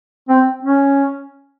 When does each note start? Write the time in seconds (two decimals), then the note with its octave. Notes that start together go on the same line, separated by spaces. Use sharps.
0.29 C4
0.63 C#4